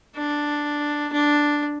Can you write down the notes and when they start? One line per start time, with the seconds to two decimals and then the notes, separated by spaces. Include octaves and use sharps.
0.16 D4
1.13 D4